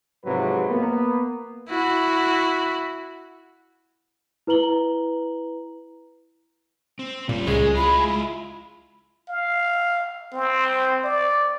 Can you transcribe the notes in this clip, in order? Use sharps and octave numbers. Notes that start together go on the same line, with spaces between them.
G#2 C3 F3 F#3 B4
A#3 B3
E4 F#4
E4 B4 A#5 F#7 G7
C4
A#2 G3 C#4
C#2 G#3 G#4
E4 F4 B5
F5
C4
D5